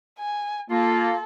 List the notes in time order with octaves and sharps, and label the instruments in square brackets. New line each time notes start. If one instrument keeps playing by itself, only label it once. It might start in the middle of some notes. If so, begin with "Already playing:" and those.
[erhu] G#5
[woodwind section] A#3 F4 [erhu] A4